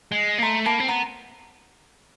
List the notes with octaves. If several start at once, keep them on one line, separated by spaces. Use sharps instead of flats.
G#3
A#3
A3 A#5 C6
A#3 A5 B5
C4
B3 A#5 C6